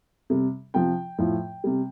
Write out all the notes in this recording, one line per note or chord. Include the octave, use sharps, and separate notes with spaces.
C3 G3
C3 F3 G5
A2 F3
C3 G3